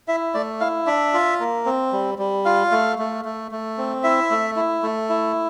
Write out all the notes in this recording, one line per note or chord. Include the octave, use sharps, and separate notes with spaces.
E4 E5
A3 D5
E4 F5
D4 E5
F4
A#3
C4
G3
G3
F4 F5
A3
A3
A3
A3
C4
E4 E5
A3
E4
A3
E4